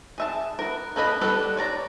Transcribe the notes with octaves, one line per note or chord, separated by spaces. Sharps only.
G#4 E5 A5
B3 A#4
A#3 A4 B4 D#5 B5
G3 B3 D4 A4 B4
C#5 D5 A#5